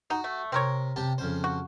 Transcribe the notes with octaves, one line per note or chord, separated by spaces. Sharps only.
D#4 F#4
A3
C3 C4 A#4 C#5
C3 G4 A5
F2 C#3 C5
F#4